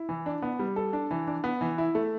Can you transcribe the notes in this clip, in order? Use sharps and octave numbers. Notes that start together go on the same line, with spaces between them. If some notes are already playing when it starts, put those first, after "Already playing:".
Already playing: E4
E3
D4
B3
G3
A4
D4
E3
D4
B3
E3
E4
A3